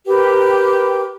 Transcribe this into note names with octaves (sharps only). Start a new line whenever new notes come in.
G4 A#4 B4 G5